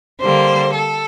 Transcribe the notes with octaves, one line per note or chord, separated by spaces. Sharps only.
D3 G3 A#3 C5
A4